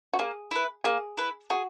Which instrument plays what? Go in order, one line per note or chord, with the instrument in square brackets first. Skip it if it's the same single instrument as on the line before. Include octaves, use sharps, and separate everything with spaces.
[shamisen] F#4
[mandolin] A#3 [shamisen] G#4
[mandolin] E4 B4
[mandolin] A#3 [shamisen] G#4
[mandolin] E4 B4
[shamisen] F#4 [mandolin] G#4